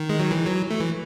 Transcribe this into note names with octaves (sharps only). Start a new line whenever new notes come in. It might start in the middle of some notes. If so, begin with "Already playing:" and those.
Already playing: D#3
G#3
F#3
E3
F#3
A3
E3